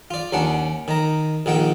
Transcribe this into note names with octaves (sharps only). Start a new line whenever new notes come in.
F4 D5
D#2 C#4 D4 F#5
D#3 A#5
A#1 D#3 F#5 G5